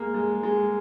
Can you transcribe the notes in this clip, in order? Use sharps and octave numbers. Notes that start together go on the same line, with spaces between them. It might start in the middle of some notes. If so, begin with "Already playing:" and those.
Already playing: G#3 A#3
G#3
G#3